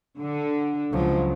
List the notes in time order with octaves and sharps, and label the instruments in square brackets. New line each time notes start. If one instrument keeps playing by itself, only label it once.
[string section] D3
[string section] C#2 [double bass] F3 F#3